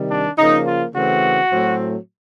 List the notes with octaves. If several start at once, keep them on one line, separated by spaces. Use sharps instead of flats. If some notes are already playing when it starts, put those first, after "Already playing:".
Already playing: C3 D#3 G3
D4
C#3 F3 A#3 D#4
F4
C#3 E3 A3 C4 F#4
A2 F#3 A3 C4